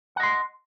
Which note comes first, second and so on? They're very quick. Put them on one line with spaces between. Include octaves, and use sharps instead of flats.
F#5 D#5 C6